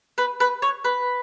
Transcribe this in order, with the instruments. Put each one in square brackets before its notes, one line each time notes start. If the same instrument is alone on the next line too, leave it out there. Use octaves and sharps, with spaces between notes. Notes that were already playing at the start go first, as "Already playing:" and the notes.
[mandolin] B4
B4
C#5
B4